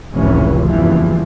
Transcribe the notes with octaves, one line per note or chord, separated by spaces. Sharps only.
F1 C#2 A2 E3 C#4
F#1 E2 G2 E3 F3